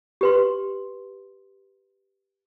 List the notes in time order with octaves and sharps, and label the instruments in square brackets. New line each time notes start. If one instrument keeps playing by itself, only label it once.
[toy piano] G4 B4 C6